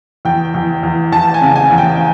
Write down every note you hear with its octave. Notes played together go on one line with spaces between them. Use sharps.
E2 G5
E2
E2
E2 A5
G#5
C#3
G#5
E2
G5